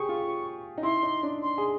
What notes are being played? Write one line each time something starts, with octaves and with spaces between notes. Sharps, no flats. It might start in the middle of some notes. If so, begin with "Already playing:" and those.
Already playing: G4 G#4 C#6
F4
D#4
E4 C6
D#4
D4
C6
G#4